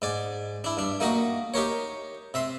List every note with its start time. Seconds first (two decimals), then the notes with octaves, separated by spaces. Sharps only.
0.02 G#2 D5 G#5
0.64 D4 E4
0.77 G2 D4
1.00 A3 A#3 D#4 F#4 D#5
1.54 D#4 G4 A#4 C#5
2.34 C3 E5 C6